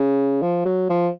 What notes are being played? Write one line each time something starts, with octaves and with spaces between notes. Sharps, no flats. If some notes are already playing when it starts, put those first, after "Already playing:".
Already playing: C#3
F3
F#3
F3